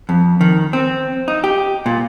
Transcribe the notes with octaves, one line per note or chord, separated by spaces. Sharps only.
F2
D#3
C4
D#4
G4
A#2